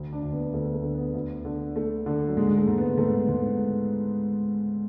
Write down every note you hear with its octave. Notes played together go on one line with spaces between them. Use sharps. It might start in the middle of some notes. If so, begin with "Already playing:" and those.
Already playing: D2
D4
D2
B3
D2 A3
A3
D3
B3
D2
D3
D3 A3
D3
F#3
G#2 G#3
G#3
A3
G#2
B3
G#2 A3
G#2